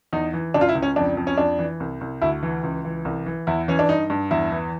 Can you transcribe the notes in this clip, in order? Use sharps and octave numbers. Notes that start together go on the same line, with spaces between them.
E2 D#4
E3
C#2 D4
F4
E4
C#2
C#4
F2 D4
F2
C#4
F2 D4
E3
C2
C2
D2 E4
E3
C#2
E3
C2
E3
E2 E4
E3 C#4
D4
G2 D#4
G2
E2 E4
E3